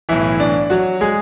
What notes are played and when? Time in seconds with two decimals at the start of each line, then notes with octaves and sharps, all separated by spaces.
0.09 B1 A2 E3 E4
0.40 D4
0.70 F#3 F#4
1.01 G#3 G#4